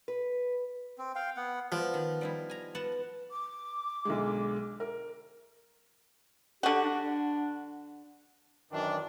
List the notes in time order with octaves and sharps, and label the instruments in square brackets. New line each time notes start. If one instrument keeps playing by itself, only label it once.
[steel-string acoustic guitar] B4
[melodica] C4
F5 G5
B3 F#5
[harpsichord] F3 [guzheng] B3 D5
[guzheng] D#3
G3 D#4 E4
G#5 A#5
B3 F#5 A5
[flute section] D6
[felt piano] B1 D3 G#3
A#4
[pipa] D3 F#4 [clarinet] G4
[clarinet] D4
[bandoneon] F#2 D#3 E3 [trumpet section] D4